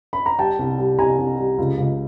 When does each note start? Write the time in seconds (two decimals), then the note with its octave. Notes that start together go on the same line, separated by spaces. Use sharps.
0.13 B5
0.26 A#5
0.39 G3 G5 A5
0.59 C2
0.79 G3
0.98 C2 G#5 A#5
1.19 C2
1.39 G3
1.58 C#2
1.78 C#2